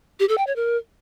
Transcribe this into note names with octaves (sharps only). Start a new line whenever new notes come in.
G4
A4
G5
C#5
A#4